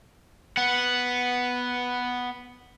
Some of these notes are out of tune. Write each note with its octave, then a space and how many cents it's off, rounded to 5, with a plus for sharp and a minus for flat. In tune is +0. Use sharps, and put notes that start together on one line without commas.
B3 +0 F#5 +0